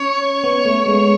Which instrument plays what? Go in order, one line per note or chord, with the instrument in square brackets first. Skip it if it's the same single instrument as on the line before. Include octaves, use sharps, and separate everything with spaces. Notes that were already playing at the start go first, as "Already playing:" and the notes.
Already playing: [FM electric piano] C#4 [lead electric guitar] C#5
[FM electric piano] B3
A3
G#3